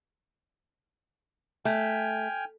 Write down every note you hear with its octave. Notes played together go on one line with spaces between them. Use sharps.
A3 G5 G#5 F6